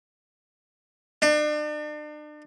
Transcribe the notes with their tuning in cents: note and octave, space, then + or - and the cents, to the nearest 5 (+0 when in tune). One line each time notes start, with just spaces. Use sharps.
D4 +40